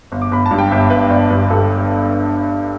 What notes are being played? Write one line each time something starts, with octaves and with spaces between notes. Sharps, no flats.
G1
D6
G1 B5
A5
G2
G5
G1 E5
G1 B4
G1 D5
G2 B4
G2 A4